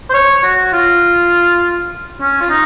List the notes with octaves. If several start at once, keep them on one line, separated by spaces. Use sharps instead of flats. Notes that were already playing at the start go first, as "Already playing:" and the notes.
C5
C#5
F#4
F4
C#4
F4
D#4